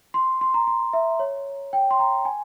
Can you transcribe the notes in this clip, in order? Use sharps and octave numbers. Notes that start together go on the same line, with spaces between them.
C6
C6
A#5
C6
E5
C#5
G5
C6
A#5
G#5